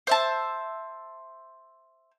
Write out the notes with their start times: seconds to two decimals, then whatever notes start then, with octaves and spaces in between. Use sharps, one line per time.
0.07 C5 E5 A5